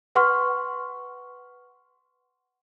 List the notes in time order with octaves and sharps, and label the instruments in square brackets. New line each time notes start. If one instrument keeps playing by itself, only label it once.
[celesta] B4 F#5 C6 C#6 F6